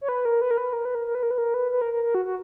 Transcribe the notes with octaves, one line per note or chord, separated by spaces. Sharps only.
C#5
B4
A#4
B4
A#4
B4
A#4
B4
A#4
A#4
B4
A#4
B4
A#4
B4
B4
A#4
A#4
A#4
F#4
F#4